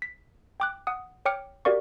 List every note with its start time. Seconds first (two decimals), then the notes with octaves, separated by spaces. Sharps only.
0.02 B6
0.60 G5 D6 F#6
0.87 F#5 D#6
1.25 C#5 G5 D6 F6 C#7
1.65 F#4 G4 A#4 D5 F5 C#6